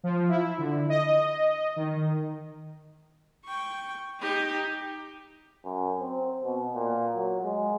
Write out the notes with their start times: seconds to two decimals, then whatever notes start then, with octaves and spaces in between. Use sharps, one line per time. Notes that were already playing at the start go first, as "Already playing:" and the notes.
0.04 F3
0.29 E4
0.59 D3
0.90 D#5
1.76 D#3
3.45 G5 C#6
4.20 D#4 G4
5.64 F#2
6.01 C4
6.43 B2
6.75 A#2
7.15 F#3
7.44 G#3